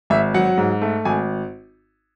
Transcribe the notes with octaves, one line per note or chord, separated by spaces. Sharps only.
G#1 E5
F#3 F#5
G#2
A3
G#1 G#5